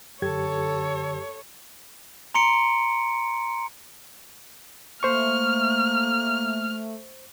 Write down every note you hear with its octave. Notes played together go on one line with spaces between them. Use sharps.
F#2 D3 G4 A4 C#5 G#6
A#5 C6 C#7 D7
A3 A#3 C5 C#6 F6